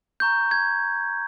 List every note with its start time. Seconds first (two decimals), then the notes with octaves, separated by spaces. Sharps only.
0.20 A#5 C#6 G6
0.51 G#6